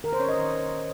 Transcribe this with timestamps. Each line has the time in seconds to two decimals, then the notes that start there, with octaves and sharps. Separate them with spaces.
0.04 D#3 A#4
0.13 C5
0.20 C#4 C#5
0.29 D#5
0.37 D#3